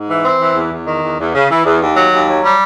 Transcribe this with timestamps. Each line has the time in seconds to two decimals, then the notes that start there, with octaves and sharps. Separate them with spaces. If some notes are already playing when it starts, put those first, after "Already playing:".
Already playing: G#2
0.09 E3
0.24 C4
0.40 E3
0.55 E2
0.71 E2
0.87 D#3
1.03 E2
1.19 E2
1.34 C#3
1.50 E3
1.65 E2
1.80 D#2
1.96 F#3
2.12 D#2
2.28 F#3
2.44 G3